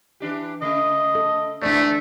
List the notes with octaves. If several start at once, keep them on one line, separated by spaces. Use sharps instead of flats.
E3 D4 G4
C#3 A3 D#5
A4
E2 G#2 A3 C4 D4 D5